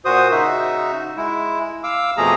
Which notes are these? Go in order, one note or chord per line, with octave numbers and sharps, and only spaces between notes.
A#2 F#4 C5 D#6
C#3 D#4 F#4 E5
G#3 E4
F5 D6 E6
F2 B2 F3 A3 G#4 A#5